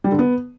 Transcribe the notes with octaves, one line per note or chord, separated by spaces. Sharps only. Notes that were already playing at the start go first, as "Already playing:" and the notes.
G3
D3
B3